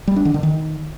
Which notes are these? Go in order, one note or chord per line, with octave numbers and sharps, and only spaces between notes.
G3
D4
D#3
D3
D#3